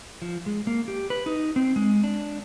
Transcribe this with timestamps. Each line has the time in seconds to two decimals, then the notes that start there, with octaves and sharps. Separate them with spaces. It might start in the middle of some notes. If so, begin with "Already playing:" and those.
0.22 F3
0.46 G#3
0.67 A#3
0.88 G4
1.10 B4
1.26 D#4
1.56 C4
1.76 G#3
2.04 D4